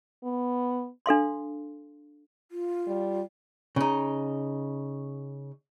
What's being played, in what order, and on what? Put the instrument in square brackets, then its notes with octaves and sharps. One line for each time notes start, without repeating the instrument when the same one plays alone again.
[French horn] B3
[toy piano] D4 A4 F5 C6
[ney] F4
[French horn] G3
[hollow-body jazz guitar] C#3 D#4